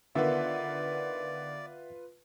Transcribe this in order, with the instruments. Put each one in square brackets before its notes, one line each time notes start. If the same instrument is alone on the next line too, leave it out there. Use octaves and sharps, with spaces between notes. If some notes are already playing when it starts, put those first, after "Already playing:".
[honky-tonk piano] D3 D#3 B3 [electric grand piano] F4 B4 [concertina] D5 [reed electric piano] E5 F#5